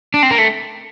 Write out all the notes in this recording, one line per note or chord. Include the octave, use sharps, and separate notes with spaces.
D4
C4
A#3
A3